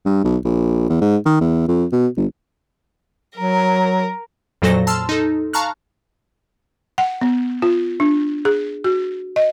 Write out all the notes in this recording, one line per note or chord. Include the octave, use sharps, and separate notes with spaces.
G2
B1
A#1
E2
G#2
D#3
E2
F2
B2
G1
F#3 A#4
F2 A#2 F#3 A4 C5 A#6
A5 C6 E6 F6
D#4 A4
F5 A5 A#5 C#6 F6 F#6
F#5
B3
F4
D4
G#4
F#4
D#5